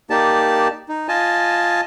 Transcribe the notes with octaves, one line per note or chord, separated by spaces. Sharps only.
A#3 D#4 G4 D5 A5
D#4
F4 D#5 G#5 A5